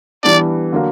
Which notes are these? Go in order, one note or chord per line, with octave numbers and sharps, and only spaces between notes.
E3 G3 B3 D4 D5
D3 F#3 A#3